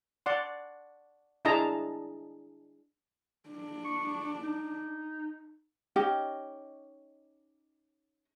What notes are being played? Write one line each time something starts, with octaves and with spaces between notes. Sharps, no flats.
D5 F#5 C6
D4 E4 G#4 D#5 A5 A#5
D4
C#6
D#4
C#4 D#4 G4 D#5